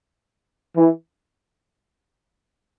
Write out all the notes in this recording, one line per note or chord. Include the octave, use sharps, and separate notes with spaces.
E3